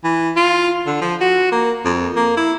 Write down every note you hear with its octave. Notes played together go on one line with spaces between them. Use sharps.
E3
F4
D3
F3
F#4
A#3
F2
A#3
E4